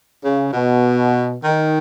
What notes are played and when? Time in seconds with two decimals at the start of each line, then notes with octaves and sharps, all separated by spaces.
0.24 C#3
0.53 B2
1.44 D#3